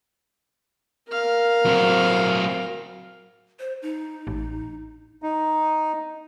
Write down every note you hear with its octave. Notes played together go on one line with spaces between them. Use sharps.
A#4 F5
F#3 C4
C5
D#4
A1
D#4